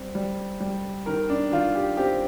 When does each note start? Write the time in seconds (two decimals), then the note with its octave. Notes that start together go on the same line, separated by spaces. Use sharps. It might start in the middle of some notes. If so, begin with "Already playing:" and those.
Already playing: G3 C4
0.15 G3
0.61 G3
1.06 D#3 A#4
1.30 D4
1.52 D#3 F4
1.76 G4
1.97 C4 G4